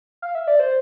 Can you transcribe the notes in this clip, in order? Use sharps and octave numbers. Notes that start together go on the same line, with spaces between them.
F5
E5
D5
C5